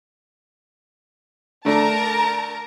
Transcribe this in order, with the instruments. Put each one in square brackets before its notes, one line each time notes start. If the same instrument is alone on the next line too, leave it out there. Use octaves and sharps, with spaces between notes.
[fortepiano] D3 A3 D4 [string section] A#4 A5 A#5